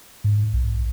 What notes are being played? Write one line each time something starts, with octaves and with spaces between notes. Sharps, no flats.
G#2
B1